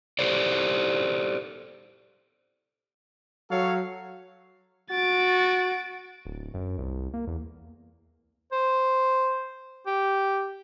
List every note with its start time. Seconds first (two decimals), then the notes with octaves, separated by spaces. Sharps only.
0.19 G4 A4 C5 D5
3.50 F#3 A4 C#5 F5
4.91 F#4 A6 D7
6.25 D1
6.54 F#2
6.78 C2
7.14 A#3
7.27 E2
8.52 C5
9.87 G4